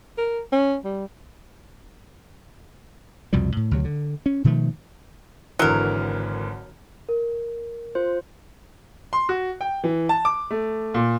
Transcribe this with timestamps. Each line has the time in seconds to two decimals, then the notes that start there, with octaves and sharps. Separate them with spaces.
0.18 A#4
0.52 C#4
0.84 G3
3.33 C2 F2 B2 G3
3.57 A2
3.71 D2 C3 F#3
3.85 D3
4.26 C#4
4.44 B2 D#3 F3 A3
5.59 G#1 D3 E3 F#3 A#4
7.09 A#4
7.95 F4 C5
9.13 C6
9.29 F#4
9.61 G5
9.84 E3
10.09 A5
10.25 D6
10.51 A3
10.94 A#2